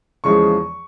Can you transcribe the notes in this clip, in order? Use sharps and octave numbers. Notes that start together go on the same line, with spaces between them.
E2 C#3 F3 G#3 C#6